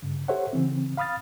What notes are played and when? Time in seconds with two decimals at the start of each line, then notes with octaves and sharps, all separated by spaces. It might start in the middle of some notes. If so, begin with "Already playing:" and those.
0.02 G2 C#3
0.28 G4 A4 C5 C#5 E5 F#5
0.53 C#3 E3 C4
0.97 F5 B5 D#6 F6 A6